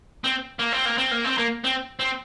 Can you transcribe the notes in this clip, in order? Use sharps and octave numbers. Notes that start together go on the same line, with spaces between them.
C4
A#3
C4
A#3
C4
A#3
C4
A#3
C4
C4